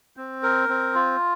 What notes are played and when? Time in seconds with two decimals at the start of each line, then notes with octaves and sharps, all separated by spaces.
0.17 C4
0.43 A#4
0.69 C4
0.95 F4